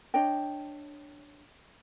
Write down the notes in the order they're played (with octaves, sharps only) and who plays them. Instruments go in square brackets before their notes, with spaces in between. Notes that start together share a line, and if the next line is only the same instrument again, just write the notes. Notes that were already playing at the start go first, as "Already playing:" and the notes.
[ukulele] D4 C#5 D#5 G5